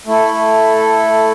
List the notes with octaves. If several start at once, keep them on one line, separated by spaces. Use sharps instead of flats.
A3 E4 A4